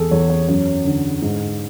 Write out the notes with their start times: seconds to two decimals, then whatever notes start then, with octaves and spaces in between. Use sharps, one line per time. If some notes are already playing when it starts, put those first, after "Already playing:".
Already playing: E2 G#4 A4
0.11 E2 C#5
0.30 C#5
0.48 F#2 C#5
0.85 D3
1.22 G#2